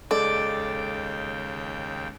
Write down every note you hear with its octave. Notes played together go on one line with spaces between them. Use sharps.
D#2 C#3 G#3 A4 D5 G5